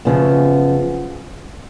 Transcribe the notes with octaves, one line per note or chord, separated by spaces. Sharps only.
F#2 C#3 F3 B3